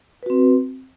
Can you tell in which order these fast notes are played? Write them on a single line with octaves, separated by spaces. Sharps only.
B4 F#4 C4